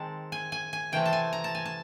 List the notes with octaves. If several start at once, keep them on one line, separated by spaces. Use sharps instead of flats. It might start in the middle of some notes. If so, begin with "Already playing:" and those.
Already playing: D#3 G#3 C4 A5
G#5
G#5
G#5
C3 E3 A3 C4 G5
A5
G#5
A#5
A5
G#5
A5